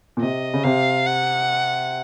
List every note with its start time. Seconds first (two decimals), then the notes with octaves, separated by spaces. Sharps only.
0.17 A#2
0.21 C3 D#5
0.54 C#3
0.64 C3 F5
1.06 F#5